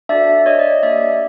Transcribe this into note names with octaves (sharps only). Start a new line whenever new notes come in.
D4 F#4 A4 D5 E5
C#5 D#5
D5
D#5
A#3 D4 G4 D5 E5